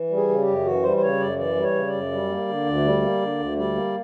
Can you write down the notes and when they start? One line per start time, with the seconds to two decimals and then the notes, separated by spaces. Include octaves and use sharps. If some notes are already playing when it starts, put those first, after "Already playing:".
Already playing: E3
0.10 G3
0.16 G#4
0.29 C#3
0.41 G4
0.47 F#2
0.65 E3 F#4
0.83 G3 C5
0.97 C5
1.02 C#3 C#5
1.20 F#2 D5
1.38 E3 D5
1.56 G3
1.63 C#5
1.74 C#3
1.87 D5
1.93 F#2
2.11 G3
2.29 A#3
2.48 D3
2.66 D2
2.84 G3
3.02 A#3
3.21 D3
3.39 D2
3.56 G3 D5
3.75 A#3